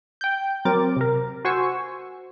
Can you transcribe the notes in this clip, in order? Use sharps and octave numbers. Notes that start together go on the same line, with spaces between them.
G5 G6
F#3 C4 A#4 D6 A6
C3 A#4
F#4 C5 G#5 C#6 E6